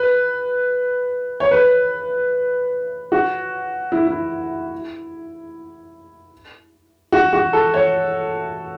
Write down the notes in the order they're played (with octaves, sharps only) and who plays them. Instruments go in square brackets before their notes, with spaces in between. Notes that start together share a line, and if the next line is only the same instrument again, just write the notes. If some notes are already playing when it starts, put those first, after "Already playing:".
Already playing: [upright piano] B4
C#5
B4
F#4
E4
E4
F#4
F#4
A4
C#5